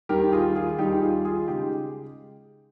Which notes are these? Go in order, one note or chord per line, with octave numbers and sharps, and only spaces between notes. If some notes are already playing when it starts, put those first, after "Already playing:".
D#2 D#3 G3 G4 A#4
F4 G#4
F4 G#4
D#2 D#3 G3 D#4 G4
F4 G#4
F4 G#4
C#3 G#3 D#4 G4